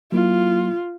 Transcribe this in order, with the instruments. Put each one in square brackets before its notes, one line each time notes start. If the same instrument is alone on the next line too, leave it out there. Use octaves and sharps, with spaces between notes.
[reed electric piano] F#3 A#3 E4 [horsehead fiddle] F4